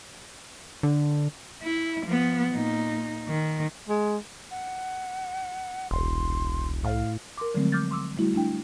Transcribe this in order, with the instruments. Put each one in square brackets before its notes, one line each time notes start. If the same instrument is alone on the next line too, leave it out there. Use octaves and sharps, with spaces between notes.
[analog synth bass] D3
[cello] E4
F3 B3
A#2 D#4
D#3
[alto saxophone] G#3
[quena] F#5
[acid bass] E1 [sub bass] C2 [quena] C6
[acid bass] A2 [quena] F5
[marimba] A#4 C6 D6
D3 F3 F#3 G#3 A3 C4
D6 F6 G6 A6
C6 D6 E6
G3 A3 E4 F#4
A3 D4 E4 G5